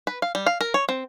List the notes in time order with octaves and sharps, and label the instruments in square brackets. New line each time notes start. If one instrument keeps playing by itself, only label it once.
[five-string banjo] B4
F5
G3
F5
A#4
C#5
C4